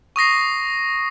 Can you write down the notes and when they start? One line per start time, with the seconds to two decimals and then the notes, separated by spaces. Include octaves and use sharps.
0.16 C#6 D#6 A#6 C7